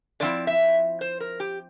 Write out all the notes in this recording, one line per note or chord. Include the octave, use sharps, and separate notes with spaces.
D3 F3 C4 E4 D5
E5
C5
A#4
G4